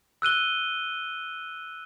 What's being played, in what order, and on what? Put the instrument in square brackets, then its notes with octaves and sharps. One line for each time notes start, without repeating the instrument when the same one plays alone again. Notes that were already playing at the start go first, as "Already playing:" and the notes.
[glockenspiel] E6 F#6 D#7 G7